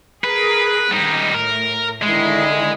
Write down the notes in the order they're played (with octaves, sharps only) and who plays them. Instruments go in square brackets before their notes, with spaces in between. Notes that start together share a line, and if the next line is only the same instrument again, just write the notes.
[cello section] G#4 A#4 [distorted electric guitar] B4
[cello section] D#3 [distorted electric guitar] G3 D#4
[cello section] A2 [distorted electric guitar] A#4
[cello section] D3 D#3 E4 [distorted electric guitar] G#3